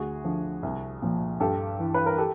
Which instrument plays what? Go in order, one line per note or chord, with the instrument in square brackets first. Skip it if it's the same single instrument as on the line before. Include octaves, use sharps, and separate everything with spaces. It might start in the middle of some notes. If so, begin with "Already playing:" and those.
Already playing: [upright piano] D2 F#4 G#4
D3 F3
C2
A#2 F3
G2 G4 A4
E3
B4
A#4
G4 A4